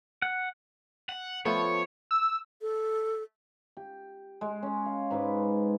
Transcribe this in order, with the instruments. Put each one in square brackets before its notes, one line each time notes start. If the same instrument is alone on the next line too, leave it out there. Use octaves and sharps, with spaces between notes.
[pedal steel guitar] F#5
[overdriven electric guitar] F#5
[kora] F3 A3 B3 [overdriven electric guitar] C#5
[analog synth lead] E6
[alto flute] A4
[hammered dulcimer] G4
G#3
C#4 C#5
F5
G#2 B4 D6